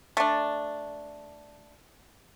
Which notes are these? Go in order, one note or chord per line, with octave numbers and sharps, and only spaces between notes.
A3 D4